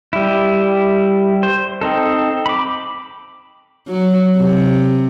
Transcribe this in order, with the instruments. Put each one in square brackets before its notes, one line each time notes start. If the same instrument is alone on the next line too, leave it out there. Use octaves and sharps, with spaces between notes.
[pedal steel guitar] G3 E4
C5
C4 D#4 A4
B5 D6
[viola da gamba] F#3
C3